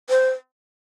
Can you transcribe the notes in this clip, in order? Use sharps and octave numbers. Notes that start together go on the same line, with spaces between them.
C5